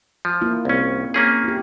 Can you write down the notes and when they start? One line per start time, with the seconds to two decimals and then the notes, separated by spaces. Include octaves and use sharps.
0.25 F3
0.41 A#3 E4 F4
0.65 C2 C4 C#4
1.14 A#3 C#4 G#4
1.44 E4 G4